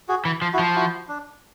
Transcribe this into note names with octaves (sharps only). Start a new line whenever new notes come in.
F#4 G#4
E3
F3
E4 F#4
F3
E4 F#4
D4